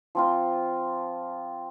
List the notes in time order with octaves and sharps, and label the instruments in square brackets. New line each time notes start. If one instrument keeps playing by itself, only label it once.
[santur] F3 C4 F4